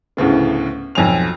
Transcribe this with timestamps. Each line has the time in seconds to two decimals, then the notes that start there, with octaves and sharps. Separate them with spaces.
0.17 D2 A2 C#3 B3
0.95 B1 F2 G#5 F7